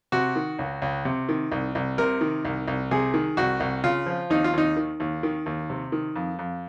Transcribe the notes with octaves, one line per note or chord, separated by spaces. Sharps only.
C3 F#4
D#3
C#2
C#2
C3
D#3
C2
C2
C3 A#4
D#3
C2
C2
C3 G#4
D#3
C2 F#4
C2
C#3 F4
F3
D#2 D#4
F4
D#2 D#4
D#3
D#2
D#3
D#2
C3
D#3
F2
F2